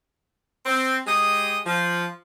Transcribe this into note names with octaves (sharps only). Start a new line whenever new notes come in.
C4
G#3 G4 G#4 D#5
F3